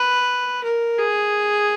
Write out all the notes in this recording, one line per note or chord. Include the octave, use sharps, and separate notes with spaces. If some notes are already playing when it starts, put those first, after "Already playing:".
Already playing: B4
A#4
G#4